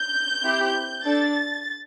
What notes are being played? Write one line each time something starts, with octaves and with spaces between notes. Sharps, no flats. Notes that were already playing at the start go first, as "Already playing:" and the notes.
Already playing: G6
C4 E4 G4
D4 A4 A6